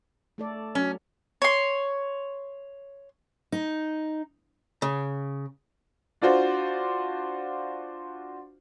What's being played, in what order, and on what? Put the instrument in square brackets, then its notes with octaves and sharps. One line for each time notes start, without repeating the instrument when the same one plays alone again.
[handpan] A3 A4 D5
[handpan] F#3 [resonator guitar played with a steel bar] C#4
[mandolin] C#5 C6
[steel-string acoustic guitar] D#4
[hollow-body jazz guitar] C#3
[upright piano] D4 F4 F#4 C5